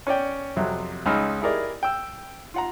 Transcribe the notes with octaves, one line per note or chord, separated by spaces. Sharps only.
C#4 C#5 D5 G5
F2 C3 F#3
C#2 C#4 D#4 B5 E6 F6
E4 G4 G#4 A#4 D5 D#5
G5 E6
F4 F#5 A#5